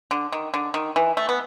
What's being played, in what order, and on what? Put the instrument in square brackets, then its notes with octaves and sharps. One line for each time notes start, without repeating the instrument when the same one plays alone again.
[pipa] D3
D#3
D3
D#3
E3
A3
B3